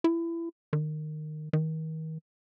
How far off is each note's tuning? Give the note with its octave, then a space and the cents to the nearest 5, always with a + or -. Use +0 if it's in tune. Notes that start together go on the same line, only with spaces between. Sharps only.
E4 +25
D#3 -20
D#3 +35